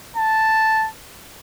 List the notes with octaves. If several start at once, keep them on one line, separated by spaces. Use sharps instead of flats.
A5